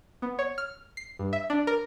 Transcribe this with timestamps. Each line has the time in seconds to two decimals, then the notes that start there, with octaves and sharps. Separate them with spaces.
0.22 B3
0.39 C#5
0.58 F6
0.97 C7
1.19 G2
1.33 E5
1.50 D4
1.67 A#4